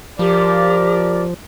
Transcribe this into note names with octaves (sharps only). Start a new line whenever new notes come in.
F3 G4 A#4 D5